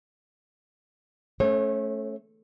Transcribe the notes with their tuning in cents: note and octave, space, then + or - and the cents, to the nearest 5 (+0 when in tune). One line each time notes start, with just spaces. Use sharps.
A3 -10 C#4 +5 C#5 -40